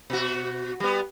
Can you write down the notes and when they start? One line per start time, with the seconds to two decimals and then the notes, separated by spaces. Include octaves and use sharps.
0.10 B2 F#4
0.80 G3 B3